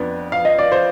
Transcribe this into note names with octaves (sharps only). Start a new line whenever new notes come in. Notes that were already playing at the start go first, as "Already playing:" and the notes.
Already playing: F2 B3 D4
F5
D#5
D5
C5